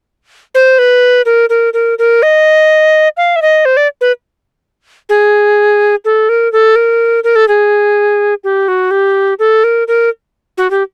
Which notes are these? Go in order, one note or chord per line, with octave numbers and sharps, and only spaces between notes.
C5
B4
A#4
A#4
A#4
A#4
D#5
F5
E5
D#5
C5
D5
B4
G#4
A4
A#4
A4
A#4
A#4
A4
G#4
G4
F#4
G4
A4
A#4
A#4
F#4
G4